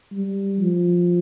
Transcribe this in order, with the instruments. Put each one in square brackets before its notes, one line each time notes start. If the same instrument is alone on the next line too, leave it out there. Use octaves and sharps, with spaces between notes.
[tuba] G3
F3